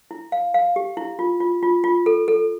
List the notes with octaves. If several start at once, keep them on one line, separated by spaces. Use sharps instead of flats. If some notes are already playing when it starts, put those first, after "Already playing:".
E4
F5
F5
G4
E4
F4
F4
F4
F4
A4
A4